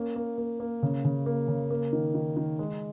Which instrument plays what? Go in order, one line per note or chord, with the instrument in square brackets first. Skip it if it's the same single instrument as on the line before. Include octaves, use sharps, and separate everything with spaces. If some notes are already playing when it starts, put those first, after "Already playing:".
Already playing: [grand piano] A#3 C#4
A#3
A#3
A#3
C#3
C#3
A#3
C#3
A#3
D#3
D#3
D#3
G#3